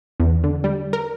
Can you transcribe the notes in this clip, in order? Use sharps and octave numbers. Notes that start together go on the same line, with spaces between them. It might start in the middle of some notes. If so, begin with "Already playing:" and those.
E2
D3
G3
A#4